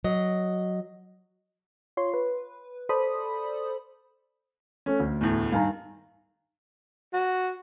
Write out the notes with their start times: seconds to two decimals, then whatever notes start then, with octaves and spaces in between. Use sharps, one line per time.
0.04 F#3 D#5
1.97 F4 C#5 C6
2.14 B4
2.89 A4 C5 D5 B5 D#6
4.86 A3 C#4
5.00 D2
5.21 E2 A2
5.52 G2 D#3 F5 G#5 A#5
7.13 F#4